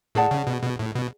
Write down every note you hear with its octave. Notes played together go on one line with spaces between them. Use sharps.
A2 G#4 D5 F#5 A5
C#3
B2
B2
A2
B2